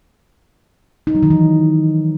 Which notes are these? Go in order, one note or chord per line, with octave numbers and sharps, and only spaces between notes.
D#4
F#3
D#3
E3